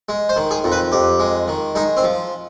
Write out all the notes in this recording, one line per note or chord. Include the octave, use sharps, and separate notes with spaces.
G#3
C5
D#3
G#4
F2
B4
F2 G4
G#3
D#3
G#3 D#4
C4
F3